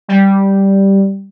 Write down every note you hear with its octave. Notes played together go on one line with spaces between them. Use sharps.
G3